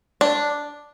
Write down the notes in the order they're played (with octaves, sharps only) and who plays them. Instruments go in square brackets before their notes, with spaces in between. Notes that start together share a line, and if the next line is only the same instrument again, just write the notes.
[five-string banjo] D4